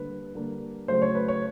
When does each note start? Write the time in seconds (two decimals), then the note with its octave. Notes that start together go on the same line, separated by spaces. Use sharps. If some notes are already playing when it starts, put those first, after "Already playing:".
Already playing: D3 G3 A#3 B4
0.35 D3 G3 A#3
0.88 C#3 F#3 A3 C5
1.02 C#5
1.15 B4
1.28 C#5